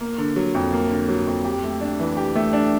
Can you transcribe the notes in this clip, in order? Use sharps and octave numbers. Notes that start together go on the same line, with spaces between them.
A#3
D3
F#3
F2
A#3
D3
F#3
F2
G4
A3
D4
E3
G4
A3
D4